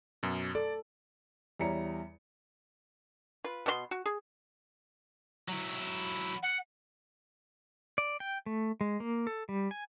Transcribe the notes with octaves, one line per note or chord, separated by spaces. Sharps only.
F#2 B2
A4 D5
E2 G3 E4 C#5 A#5 C#7
F4 B4
B2 B3 D4 C6
F#4
G#4
F#3 E4
F#5
D5
G5
A3
G#3
A#3
A4
G3
G#5